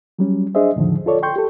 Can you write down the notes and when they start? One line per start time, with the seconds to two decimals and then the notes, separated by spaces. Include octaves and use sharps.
0.19 F#3 G3 C#4
0.55 D4 G#4 C5 D#5 E5
0.76 F2 A2 D3 D#3 F3
1.06 F4 A4 C#5 D5
1.23 G5 C6 C#6 G6
1.36 G4 A4